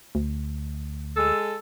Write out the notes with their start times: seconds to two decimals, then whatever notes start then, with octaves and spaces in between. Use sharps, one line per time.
0.15 D2
1.16 G#3 A4